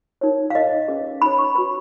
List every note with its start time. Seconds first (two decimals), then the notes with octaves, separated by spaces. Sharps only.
0.21 D#4 A#4 C#5
0.50 F5
0.55 D#4 A#4 C#5 D#5
0.88 C#4 G#4 B4
1.22 D#4 G#4 C#5 B5
1.38 C#6
1.55 F#4 B4 B5